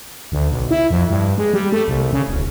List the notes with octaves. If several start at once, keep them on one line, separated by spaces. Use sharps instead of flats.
D2
B1
E4
F2
G2
G#3
G3
A3
C2
C#3
D1